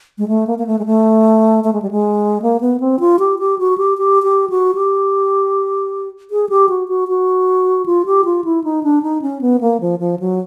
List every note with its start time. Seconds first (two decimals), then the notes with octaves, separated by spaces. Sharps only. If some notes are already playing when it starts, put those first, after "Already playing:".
0.18 G#3
0.28 A3
0.47 A#3
0.58 A#3
0.67 A3
0.79 G#3
0.86 A3
1.64 A3
1.73 G#3
1.82 G3
1.91 G#3
2.42 A#3
2.60 B3
2.80 C4
3.00 F4
3.19 G4
3.39 G4
3.59 F#4
3.78 G4
3.98 G4
4.23 G4
4.50 F#4
4.75 G4
6.31 G#4
6.49 G4
6.69 F#4
6.88 F#4
7.08 F#4
7.86 F4
8.06 G4
8.25 F4
8.44 E4
8.64 D#4
8.83 D4
9.03 D#4
9.22 C#4
9.41 B3
9.61 A#3
9.81 F3
9.99 F3
10.19 F#3